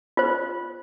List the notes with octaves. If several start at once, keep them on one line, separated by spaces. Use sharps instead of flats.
F4 C5